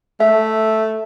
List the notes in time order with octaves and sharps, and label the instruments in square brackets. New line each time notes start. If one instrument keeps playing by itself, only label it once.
[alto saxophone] A3 [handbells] E5